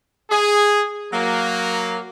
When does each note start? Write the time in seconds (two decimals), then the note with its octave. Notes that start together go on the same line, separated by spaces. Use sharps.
0.30 G#4
1.12 F#3 A#3